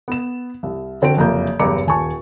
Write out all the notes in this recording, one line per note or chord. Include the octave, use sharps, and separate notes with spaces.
B3 E7
C2
D3 C4 F#4 G5 D7
F#1 C2 F2 A#3 A#5 G6
F#1 E2 G2 A#5 D6 C#7
D#1 G#5 A5 C#6